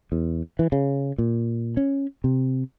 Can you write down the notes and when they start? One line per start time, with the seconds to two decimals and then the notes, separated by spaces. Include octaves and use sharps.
0.12 E2
0.59 E3
0.72 C#3
1.18 A#2
1.77 C#4
2.24 C3